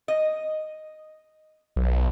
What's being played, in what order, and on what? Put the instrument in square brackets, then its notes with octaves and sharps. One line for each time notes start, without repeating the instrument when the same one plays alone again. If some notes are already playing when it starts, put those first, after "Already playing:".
[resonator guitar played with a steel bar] D#5
[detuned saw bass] B1